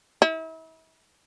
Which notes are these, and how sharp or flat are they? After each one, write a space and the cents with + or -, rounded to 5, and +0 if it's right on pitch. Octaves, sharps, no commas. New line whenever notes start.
E4 -40